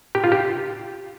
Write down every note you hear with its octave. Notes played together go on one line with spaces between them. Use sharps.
G4
F4
G4